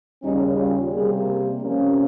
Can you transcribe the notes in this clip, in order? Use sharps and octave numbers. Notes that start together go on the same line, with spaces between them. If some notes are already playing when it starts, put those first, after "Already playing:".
D#2 C#3 G3 C#4 D#4
F4
C3 G3 A#3 G#4
C3 F3 A#3 C#4